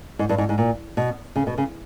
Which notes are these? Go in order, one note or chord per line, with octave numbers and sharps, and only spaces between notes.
G#2
G2
G#2
G#2
A#2
B2
C#3
B2
C#3